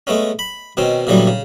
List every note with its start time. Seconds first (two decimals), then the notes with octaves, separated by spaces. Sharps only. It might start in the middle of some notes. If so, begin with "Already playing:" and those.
0.07 G#3 A3 B3 C#4
0.39 B5
0.77 B2 D#3 C4 C#4
1.07 A#2 D3 E3 F#3 G3 B3
1.27 C#3